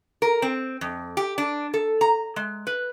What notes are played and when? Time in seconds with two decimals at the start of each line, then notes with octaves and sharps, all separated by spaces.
0.22 A#4
0.42 C4
0.81 F2
1.17 G4
1.38 D4
1.74 A4
2.01 A#5
2.36 G#3
2.67 B4